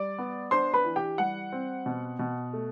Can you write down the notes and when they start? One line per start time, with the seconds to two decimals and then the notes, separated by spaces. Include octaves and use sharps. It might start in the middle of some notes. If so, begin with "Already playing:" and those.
Already playing: G3 D5 D6
0.18 B3
0.51 D4 C5 C6
0.74 B4 B5
0.84 E3
0.96 G4 G5
1.18 G3 F#5
1.52 C4
1.86 B2
2.19 B2
2.53 A3